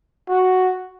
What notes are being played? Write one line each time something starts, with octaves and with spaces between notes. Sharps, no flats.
F#4